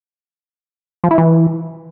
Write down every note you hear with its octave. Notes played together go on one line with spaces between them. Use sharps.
F3
E4
E3